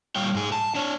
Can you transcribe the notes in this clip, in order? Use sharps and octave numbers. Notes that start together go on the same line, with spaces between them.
A#2 G3 C#5 F5 G5
G#2 G#4
A5
D4 C#5